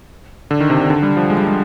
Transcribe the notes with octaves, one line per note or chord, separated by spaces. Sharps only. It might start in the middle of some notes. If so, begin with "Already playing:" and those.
D3
D#3
C3
C3
D3
G3
F3
G#3
G3
G#3